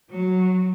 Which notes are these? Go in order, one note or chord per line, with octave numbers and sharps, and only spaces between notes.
F#3